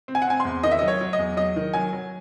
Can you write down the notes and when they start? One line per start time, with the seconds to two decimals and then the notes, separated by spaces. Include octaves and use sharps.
0.08 C4
0.15 G#5
0.22 F#5
0.27 C4 G#5
0.40 E2 C6
0.63 D#3 D#5
0.72 E5
0.79 F#3 D#5
0.88 C#5
1.01 F#3
1.13 D#5
1.19 E2
1.37 F#3 D#5
1.56 D#3
1.73 F#3 G#5
1.93 F#3